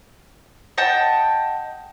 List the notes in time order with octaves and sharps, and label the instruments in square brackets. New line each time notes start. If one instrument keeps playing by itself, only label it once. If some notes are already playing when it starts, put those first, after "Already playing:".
[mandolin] D#5 F#5 G5 A5